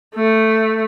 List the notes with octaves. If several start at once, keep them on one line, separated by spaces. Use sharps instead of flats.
A3